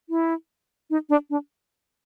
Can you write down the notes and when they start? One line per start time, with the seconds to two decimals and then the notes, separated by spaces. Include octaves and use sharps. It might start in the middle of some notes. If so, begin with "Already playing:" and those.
0.09 E4
0.90 D#4
1.09 D4
1.30 D4